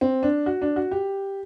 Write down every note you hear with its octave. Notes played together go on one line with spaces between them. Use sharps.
C4
D4
F#4
D4
F#4
G4